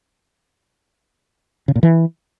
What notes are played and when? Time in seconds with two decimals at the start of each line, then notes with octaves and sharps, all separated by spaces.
1.68 C#3
1.75 A#2
1.83 E3